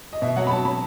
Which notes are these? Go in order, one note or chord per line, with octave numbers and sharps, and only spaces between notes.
D#5
B2 E5
F#3 F#5
B5
F#3 A5
F#3 B5